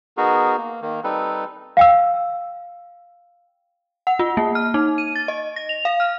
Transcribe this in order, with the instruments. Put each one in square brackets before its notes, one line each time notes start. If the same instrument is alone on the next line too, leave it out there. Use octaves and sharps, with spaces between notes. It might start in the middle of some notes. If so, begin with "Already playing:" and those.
[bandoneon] B3 D#4 F#4 G#4 A#4
A#3
D#3 A#3
G3 C4 D#4 A4 B4
[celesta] F5 G5 E6
[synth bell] F#5
F4
A#3
F6
D#4
D#7
A6
D#5
A#6
F7
F5
F6